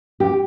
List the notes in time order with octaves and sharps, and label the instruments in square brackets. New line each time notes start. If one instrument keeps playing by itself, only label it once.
[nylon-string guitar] G4